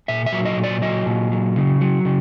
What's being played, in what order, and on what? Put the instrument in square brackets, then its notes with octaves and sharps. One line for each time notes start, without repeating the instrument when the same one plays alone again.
[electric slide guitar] A#2 E5
E5
F#3
D#5
A#2
D5
F#3 D#5
A#2
F#3
C#3
F#3
C#3